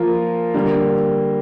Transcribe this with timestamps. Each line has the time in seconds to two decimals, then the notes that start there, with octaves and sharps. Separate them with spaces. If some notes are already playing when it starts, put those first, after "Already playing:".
Already playing: F3 A#3 F4 A#4
0.54 D3 G3 A#3